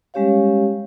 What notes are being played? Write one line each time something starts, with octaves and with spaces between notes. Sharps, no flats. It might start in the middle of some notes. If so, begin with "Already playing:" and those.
G3 G#3 C#4 G4 C#5 F5